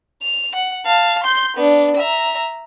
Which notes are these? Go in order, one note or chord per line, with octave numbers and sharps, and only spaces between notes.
F7
F#5
F5 A5
C6 G6
B3 D4
E5 A#5